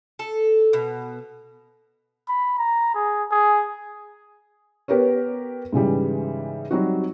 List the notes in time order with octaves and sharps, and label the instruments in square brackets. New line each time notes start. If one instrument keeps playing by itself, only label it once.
[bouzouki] A4
B2
[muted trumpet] B5
A#5
G#4
G#4
[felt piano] B3 G4 A#4 B4 C#5
G#2 C#3 E3 G3
F#3 G3 C4 D#4 F#4